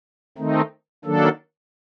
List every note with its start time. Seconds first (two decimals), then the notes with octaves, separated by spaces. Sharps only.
0.38 D#3 A3 C4 D#4
1.05 D#3 F#3 A#3 D4 A4